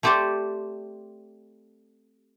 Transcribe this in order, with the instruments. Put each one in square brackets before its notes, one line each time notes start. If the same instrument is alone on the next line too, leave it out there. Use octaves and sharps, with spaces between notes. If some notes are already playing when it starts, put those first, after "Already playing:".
[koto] A3 C4 G4 C5 D5